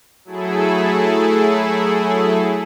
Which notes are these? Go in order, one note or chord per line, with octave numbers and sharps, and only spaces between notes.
F#3 A3 E4 G#4 A4